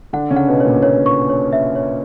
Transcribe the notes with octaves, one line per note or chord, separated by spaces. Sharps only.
D3 D4 F#5
C#3 C#4
F#5
B2 B3
C#5
A#2 A#3
A#2 A#3 C#5
C#6
C#5
E5
C#5